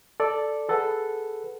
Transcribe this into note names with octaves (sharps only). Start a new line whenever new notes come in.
A4 D5
G#4 A4 B4 F#5